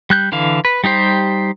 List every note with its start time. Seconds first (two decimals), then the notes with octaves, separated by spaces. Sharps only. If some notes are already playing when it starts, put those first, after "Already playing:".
0.10 G3 F#6 G6
0.32 D3 E3 F5
0.65 B4
0.84 G3 D#4 G4 C5